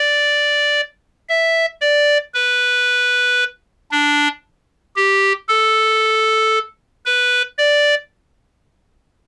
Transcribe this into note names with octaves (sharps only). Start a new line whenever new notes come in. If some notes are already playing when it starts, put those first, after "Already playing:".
Already playing: D5
E5
D5
B4
D4
G4
A4
B4
D5